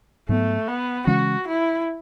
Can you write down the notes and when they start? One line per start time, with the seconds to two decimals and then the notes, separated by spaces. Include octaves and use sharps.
0.29 G#2 F#3 A3 B3
0.68 B3
1.07 C#3 E3 G#3 C#4 F#4
1.47 E4